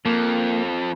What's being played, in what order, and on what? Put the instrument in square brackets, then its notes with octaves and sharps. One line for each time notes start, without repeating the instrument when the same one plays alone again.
[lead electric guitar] F2 [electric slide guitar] A#3